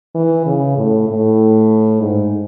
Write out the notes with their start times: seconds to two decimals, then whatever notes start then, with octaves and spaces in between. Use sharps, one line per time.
0.15 E3
0.46 C#3
0.77 A2
1.08 A2
2.00 G#2